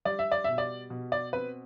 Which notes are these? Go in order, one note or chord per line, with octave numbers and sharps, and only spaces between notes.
G3 D5
E5
D5
B2 E5
D5
B2
D5
C4 B4